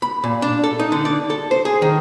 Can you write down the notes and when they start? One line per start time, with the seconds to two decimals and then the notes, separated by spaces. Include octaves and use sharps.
0.02 B5
0.24 A#2
0.42 D4
0.64 A4
0.80 D#4
0.92 D3
1.05 D5
1.30 A4
1.51 C5
1.65 G#4
1.82 D#3